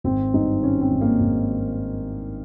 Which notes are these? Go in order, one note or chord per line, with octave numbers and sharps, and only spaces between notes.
G#1 C4
G2 D#4
D#3 C#4
C4
G#1
A#3
G#1